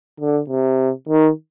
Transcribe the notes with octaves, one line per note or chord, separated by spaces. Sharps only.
D3
C3
D#3